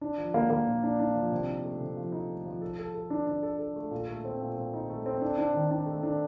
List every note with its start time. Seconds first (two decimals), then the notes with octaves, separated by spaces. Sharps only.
0.01 D4
0.18 F3
0.34 A#3
0.50 A#3
0.67 A#2
0.83 D4
0.99 D4
1.15 F3
1.32 C3
1.48 D#4
1.64 A3
1.80 C3
1.97 F3
2.12 D#4
2.29 A3
2.45 F3
2.62 A4
2.79 A4
2.95 A4
3.10 D4
3.27 D4
3.43 A4
3.59 A4
3.76 A3
3.91 A#2
4.08 A3
4.25 C4
4.41 A#2
4.57 A#2
4.74 D#4
4.90 A3
5.06 C4
5.21 D4
5.38 D4
5.54 D#3
5.71 D4
5.86 A3
6.03 D4